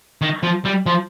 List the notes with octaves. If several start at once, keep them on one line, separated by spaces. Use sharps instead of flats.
D#3
F3
G3
F3